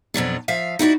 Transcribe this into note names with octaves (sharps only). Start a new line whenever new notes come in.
F2 B2 F#3 D4
F3 E5 F5
D#4 E4 F#4 D5